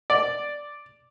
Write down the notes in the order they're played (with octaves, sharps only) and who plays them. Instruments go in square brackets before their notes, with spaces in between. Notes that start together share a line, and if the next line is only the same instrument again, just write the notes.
[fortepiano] D5